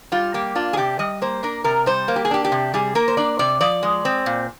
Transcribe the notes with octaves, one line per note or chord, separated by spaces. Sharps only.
G3 F4
A#3 G4
D4 F4
G#4
C3 G4
G3 D#5
A#3 C5
D4 A#4
C3 A#4
G3 C5
A#3
G4
G#4
D4 G4
G4
C3
G3 G#4
A#3 A#4
C5
D4 D5
C3 D5
F3 D5
G#3
C4
A#2